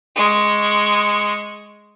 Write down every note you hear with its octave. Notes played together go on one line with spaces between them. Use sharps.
G#3 C#6